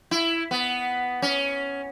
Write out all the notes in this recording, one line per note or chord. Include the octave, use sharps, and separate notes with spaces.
E4
B3
C#4